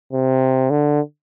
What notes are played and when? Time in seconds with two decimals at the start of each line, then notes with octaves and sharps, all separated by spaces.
0.13 C3
0.70 D3